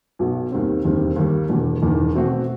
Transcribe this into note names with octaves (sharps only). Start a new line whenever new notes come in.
B1 B2 F#3 B3
D#2 D#3 G3 C4
E1 D#2 D#3 G3 C4
D#2 D#3 G3
E1 E2 B2
E1 E2 D#3
B2 A3 C4 F#4